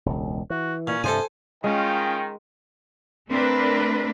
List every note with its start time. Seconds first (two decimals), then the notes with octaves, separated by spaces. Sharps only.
0.06 E1 C#2
0.50 E3 F#4
0.87 A#2 C#4
1.04 G2 C3 F3 A4 C5 G#5
1.64 D#3 G#3 C#4 F4 G5
3.29 A3 C4 D4 A#4 B4